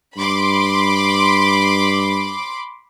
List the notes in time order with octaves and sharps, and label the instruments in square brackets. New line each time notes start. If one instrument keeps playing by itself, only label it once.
[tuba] G2 [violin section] B5 C6 D6